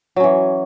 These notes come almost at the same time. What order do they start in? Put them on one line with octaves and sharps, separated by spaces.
F#3 C#4 E3